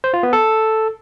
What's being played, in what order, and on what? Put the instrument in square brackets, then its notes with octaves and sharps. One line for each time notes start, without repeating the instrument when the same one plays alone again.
[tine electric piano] C5
F4
B3
A4